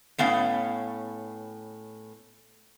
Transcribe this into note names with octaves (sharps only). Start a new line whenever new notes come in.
A2 B3 C#4 F5